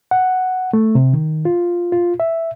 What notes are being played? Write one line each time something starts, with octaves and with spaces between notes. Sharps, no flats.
F#5
A3
C3
D#3
F4
F4
E5